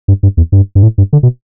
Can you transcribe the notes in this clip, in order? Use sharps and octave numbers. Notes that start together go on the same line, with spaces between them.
G2
G2
E2
G2
G2
A2
G2
D3
B2